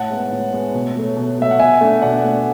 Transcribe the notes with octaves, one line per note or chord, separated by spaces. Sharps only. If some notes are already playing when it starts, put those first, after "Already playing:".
Already playing: A2 F#5 A5
G#3 B3
A2
G#3 B3
B2
F#3 A3
B2
F#3 A3 E5
F#5
B2 E5 G#5
A3 D4
B2 D5 F#5
A3 D4